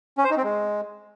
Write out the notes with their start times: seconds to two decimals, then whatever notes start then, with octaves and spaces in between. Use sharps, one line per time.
0.18 C#4
0.24 C5
0.31 D#4
0.37 C4
0.44 G#3